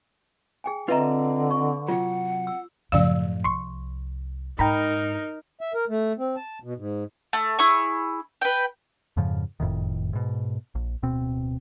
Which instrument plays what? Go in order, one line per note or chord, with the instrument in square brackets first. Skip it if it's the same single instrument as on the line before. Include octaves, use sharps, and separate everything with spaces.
[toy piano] G#4 G5 G#5
[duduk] D3 [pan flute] C4 [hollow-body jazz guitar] F4 D#5 [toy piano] B4 E5 A#5
[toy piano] C#6
[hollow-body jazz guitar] C3 F#3 [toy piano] F4 [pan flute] F#5
[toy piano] E6
[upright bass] F#2 A2 [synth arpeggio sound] C#3 E6 [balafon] F3 D5 F5
[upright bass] C2 [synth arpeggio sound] C6 C#6
[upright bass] G#2 [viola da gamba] D#4 A#4 [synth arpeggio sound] G5 A#5 B5
[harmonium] E5
A#4
A3
C4
A5
B2
G#2
[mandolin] A3
E4 G#4 C#6
B4 G5
[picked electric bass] F2 G#2 C#3 F3
F#1 F2 A2 D#3
G#2 B2
A#1
D1 B2 C4